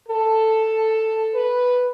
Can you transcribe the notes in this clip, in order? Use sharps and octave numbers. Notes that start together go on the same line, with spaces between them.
A4
B4